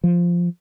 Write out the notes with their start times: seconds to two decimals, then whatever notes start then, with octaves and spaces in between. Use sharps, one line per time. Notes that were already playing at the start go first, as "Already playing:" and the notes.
0.04 F3